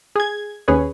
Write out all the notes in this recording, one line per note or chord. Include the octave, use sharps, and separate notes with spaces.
G#4 G#6
D#2 C#4 G#4 B4 C#5